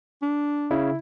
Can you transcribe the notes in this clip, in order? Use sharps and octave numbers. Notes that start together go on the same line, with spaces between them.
D4
C#3 E4